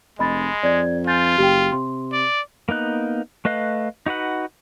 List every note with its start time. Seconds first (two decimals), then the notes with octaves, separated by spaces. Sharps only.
0.19 F1 G#3 D#5 B5 A6
0.63 F2 D5 G#6
1.07 F4 G#5 G6 A6
1.38 F#1 G4 G5
1.72 C3 C6
2.13 D5
2.69 A#3 B3 D#4 F#6
3.45 A3 B4 D#5 F5 F#6
4.06 D#4 F#4 B4 F#5